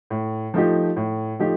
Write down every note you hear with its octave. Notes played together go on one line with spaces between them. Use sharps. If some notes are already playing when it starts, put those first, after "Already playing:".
A2
F3 A3 D#4 G4
A2
F3 A3 D#4 G4